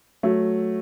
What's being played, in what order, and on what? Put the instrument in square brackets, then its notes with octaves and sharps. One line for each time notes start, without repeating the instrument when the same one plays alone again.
[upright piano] F#3 A3